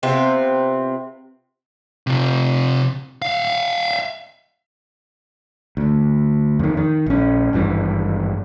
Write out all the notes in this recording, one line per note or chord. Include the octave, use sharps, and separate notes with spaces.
C3 B3 C4 F4
C3 F4
E5 F5
D2
F2 D#3
D#3
A#1 C#4
G#1 G2 E3